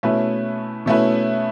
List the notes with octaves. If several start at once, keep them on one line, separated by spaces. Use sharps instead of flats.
B2 A3 C#4 E4 B4
B2 A3 C#4 E4 B4